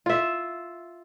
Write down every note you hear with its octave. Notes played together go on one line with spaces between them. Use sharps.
F4 E5